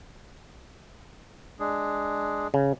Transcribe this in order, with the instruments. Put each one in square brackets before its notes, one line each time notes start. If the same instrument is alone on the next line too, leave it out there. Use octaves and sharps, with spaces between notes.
[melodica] G#3 D4 G#4
[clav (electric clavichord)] C#3